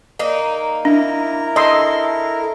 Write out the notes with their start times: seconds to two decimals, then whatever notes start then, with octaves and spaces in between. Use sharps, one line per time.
0.19 A#3 D#4
0.85 D4 E4 A#4
1.56 A4 D#5 C6